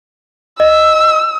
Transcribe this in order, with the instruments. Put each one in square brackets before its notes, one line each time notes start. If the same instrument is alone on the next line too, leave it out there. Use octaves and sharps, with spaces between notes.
[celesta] D#5 [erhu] E6